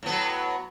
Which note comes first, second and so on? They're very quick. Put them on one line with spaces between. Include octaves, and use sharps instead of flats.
A2 B3 F#3